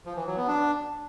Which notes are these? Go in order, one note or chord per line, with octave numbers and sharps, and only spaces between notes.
F3
E3
F#3
B3
D4